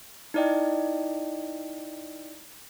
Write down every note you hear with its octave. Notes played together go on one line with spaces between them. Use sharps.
D#4 E4 D5 D#5 G5